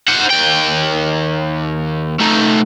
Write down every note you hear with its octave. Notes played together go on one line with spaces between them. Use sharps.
C5 F#5
D#2 G5
A3 D#4